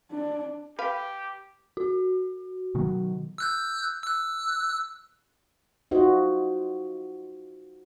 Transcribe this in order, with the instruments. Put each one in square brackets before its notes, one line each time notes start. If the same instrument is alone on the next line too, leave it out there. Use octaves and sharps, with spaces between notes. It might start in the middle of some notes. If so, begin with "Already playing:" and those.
[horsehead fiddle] D4
[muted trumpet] G4 [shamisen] B4 F5
[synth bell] F#4
[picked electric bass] B2 D#3 F#3
[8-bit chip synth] E6 F#6 G6
E6 F#6
[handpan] D#4 F4 F#4 C5 D#5